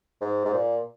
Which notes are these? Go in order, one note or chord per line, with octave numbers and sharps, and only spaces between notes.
G#2
G#2
A#2